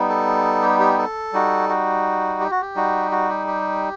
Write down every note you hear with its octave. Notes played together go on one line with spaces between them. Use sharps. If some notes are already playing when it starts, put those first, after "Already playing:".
Already playing: G3 B3 D#4
A4
G4
G4
A4
G3 D#4 F#4
F#4
G4
F#4
G4
G3 D#4 F#4
F#4
G4
G4